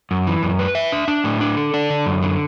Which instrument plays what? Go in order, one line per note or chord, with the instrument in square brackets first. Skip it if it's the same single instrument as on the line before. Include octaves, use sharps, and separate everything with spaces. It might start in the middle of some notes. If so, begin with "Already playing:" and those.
[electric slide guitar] F#2
E3
F#2
B4
E5
D4
D4
A2
D4
A4
D4
D3
F#2
D3